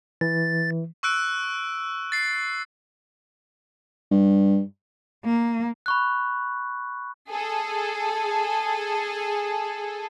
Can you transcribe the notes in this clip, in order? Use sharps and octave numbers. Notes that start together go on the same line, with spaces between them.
E3 A6
C#6 E6 F#6 D7
A6 C7
G2
A#3
B5 C#6 F#6
G#4 A4